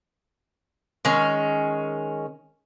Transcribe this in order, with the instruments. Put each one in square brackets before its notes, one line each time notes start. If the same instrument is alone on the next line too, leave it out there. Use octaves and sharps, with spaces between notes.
[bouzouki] D#3 G#3 C#4